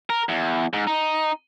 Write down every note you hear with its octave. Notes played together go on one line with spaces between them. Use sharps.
A#4
E2
G#2
D#4